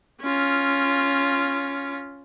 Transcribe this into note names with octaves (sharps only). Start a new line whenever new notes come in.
C#4 F4